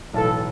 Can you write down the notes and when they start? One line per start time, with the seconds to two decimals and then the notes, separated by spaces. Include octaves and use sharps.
0.14 B1 A2 E3 A4